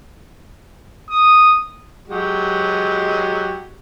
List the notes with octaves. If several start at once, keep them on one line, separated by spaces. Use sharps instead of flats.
D#6
F#3 G#3 G4